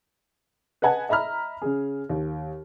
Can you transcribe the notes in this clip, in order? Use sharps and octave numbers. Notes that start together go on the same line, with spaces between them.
B4 D#5 F#5 G#5 A5
D#5 E5 A#5 B5 F6
C#3 G#4
D#2